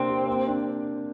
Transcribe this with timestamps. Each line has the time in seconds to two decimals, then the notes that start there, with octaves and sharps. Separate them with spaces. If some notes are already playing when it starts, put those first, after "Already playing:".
Already playing: C3 A#3 C4 D4
0.09 G4
0.27 A#3
0.47 D4